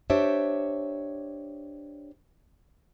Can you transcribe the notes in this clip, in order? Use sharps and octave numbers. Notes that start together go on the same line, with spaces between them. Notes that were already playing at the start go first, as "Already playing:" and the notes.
D4 G4 C5 C#5 E5